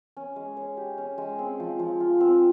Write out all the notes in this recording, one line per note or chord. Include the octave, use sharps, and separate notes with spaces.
C#4
G#3
C#5
G4
C#4
G#3
C4
F3
F3
F4
C4